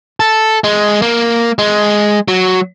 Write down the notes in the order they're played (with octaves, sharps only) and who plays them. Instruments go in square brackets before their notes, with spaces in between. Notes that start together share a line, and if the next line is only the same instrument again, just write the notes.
[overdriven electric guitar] A4
G#3
A#3
G#3
F#3